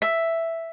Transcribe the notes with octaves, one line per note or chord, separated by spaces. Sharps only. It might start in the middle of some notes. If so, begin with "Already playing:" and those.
E5